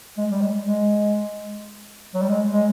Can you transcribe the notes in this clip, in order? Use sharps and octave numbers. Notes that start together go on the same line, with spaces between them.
G#3
G3
G#3
G#3
F#3
G3
G#3
G#3